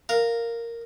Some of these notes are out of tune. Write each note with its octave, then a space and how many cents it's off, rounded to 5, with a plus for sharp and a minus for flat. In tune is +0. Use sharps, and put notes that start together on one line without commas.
A#4 -5 F5 +0